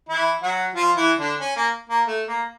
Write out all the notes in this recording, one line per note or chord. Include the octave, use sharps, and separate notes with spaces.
E3 E4
F#3 F#4
F3 F4
E3 E4
D3 D4
C#4
A#3
A#3
A3
A#3